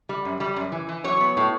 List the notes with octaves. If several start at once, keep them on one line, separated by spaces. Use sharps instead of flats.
G3
F#2
G3
F#2
E3
E3
F#3 C#5
B3
A2